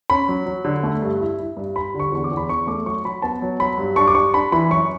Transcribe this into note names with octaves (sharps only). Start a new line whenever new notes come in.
C#4 B5
F#3
F#3
D3
A3
G2
E4
E4
G2
G3 B5
D3
C#6
E2 C#6
D6
E2
B5
E2 C#6
A3 D6
F#3 C#6
F#3 B5
B3 A5
F#3
F#3 B5
G2
D4 C#6
D6
G3 C#6
D4 B5
E3 B5
F#2 C#6